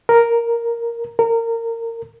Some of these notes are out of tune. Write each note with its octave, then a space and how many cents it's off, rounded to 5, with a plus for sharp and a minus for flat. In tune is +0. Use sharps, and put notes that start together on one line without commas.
A#4 +0
A#4 -25